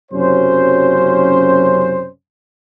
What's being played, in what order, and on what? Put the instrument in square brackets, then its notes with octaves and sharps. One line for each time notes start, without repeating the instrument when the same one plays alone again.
[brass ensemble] F#1 F#2 C3 F#3 C#4 C5